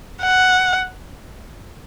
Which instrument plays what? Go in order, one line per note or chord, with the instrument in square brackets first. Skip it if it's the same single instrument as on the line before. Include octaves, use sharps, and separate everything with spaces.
[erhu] F#5